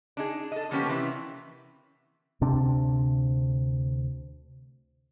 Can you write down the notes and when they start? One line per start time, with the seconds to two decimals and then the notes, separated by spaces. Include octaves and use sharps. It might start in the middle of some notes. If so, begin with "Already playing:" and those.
0.17 D4 D#4 G#4
0.52 A4 D#5
0.71 F3 A#3 B3 C#4 G4
0.86 C3 E3
2.41 D2 C3 C4 D4